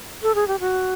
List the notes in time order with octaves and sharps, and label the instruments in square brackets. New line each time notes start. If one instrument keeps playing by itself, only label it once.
[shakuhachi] A4
G#4
G4
F#4